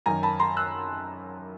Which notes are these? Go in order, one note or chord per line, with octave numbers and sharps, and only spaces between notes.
F#2 D#3 G#5 A#5
A5 B5
A#5 C6
E6 F#6